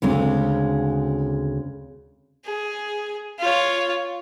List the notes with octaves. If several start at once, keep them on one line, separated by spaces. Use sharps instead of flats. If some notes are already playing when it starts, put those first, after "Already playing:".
D2 C#3 G#3 C4
G#4
F4 C#5